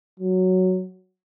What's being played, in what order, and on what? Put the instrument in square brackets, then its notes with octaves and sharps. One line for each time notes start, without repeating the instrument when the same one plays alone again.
[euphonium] F#3